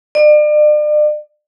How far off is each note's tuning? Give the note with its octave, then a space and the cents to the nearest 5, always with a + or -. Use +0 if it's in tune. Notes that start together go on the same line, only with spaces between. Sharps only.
D5 +40